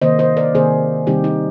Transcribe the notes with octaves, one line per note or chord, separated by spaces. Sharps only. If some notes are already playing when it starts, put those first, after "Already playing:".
C3 D#3 A#3 C5 D#5
C5 D#5
A#4 D5
C3 D#3 A#3 G#4 C5
C3 D#3 G3 C4 D#4 G4
D#4